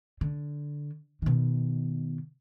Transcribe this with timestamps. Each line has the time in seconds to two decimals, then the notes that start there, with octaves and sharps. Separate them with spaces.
0.21 D3
1.22 B2 D#3